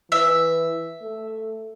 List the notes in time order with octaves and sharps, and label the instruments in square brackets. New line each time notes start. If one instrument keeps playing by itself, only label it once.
[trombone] E3 [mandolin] E5
[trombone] A3